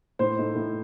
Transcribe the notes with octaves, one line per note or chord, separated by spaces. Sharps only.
A2 C5
A3 D#4
A2